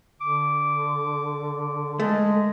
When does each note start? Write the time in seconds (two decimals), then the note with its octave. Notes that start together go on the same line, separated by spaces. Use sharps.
0.21 D3 D6
2.00 G#3 A3